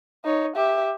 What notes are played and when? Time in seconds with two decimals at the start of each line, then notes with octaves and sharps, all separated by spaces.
0.24 D#4 C#5
0.56 G4 E5